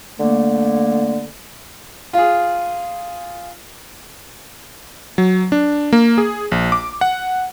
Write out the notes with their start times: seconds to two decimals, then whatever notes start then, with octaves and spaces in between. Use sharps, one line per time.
0.19 D3 A3 A#3
2.13 F4 G#4
5.18 F#3
5.52 D4
5.93 A#3
6.18 G#4
6.52 A#1
6.72 D6
7.01 F#5